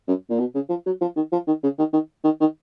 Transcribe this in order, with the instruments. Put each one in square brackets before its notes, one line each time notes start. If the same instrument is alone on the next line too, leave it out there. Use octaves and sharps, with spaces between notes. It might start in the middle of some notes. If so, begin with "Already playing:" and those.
[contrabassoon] F#2
A#2
B2
C#3
F3
F#3
F3
D#3
F3
D#3
C#3
D#3
D#3
D#3
D#3